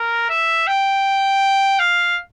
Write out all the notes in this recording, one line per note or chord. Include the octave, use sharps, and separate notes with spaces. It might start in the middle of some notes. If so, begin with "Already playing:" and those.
Already playing: A#4
E5
G5
F5